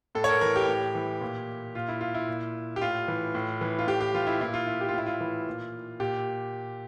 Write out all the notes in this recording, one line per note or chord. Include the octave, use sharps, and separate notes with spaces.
A2 A4
C#5
A#4
E3 A#4
G4
A2
E3
A#2
A#2 F4
E4
F4
E4
A#2
G4
A2 F4
E3
A2
E3
F4
A2 G4
G4
E3 F4
E4
A#2 E4
F4
E4
G4
F4
A2 E4
F4
E3
A#2
A#2 G4